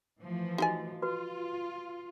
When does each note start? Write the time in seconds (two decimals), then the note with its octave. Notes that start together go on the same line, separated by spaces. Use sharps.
0.21 E3 F3 A3
0.58 D#4 F#4 G4 D#5 G#5
1.02 F4 F#4 B4